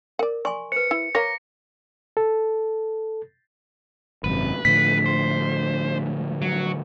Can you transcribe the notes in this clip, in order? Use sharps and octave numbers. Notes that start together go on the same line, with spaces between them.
A#4 D5 F#5
D5 G#5 C6 C#6
B4 C5 C#7
E4
A#4 C#5 F5 A#5 D6 A#6
A4
G#1 F#2 C3 B4
A2 D3 F3 B6
C5
F#3